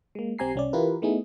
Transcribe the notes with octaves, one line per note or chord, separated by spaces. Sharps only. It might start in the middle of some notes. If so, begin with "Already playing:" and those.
G#3 A#3
B1 C4 G4 G#5 A#5 C7
C2 C#4 D5
E3 E4 F4 G4 A#4 B4
A3 B3 D#4 E4 G#4